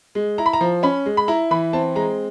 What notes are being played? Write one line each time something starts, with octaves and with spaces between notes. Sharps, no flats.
G#3
E4 A#5
B5
A#5
F3
C#4 B5
G#3
B5
E4 A#5
E3 B5
C4 A5
G#3 A#5